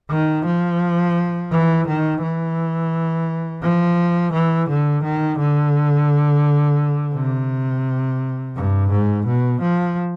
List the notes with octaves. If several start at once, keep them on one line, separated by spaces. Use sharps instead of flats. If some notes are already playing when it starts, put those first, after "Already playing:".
D#3
F3
E3
D#3
E3
F3
E3
D3
D#3
D3
C3
G2
G#2
B2
F3